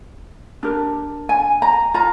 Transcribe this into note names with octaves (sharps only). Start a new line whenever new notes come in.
D4 G4 A#4
G#5
A#5
F4 A#5